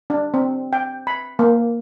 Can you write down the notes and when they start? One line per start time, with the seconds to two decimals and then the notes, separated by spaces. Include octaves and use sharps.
0.10 D4
0.34 C4
0.73 G5
1.07 B5
1.39 A#3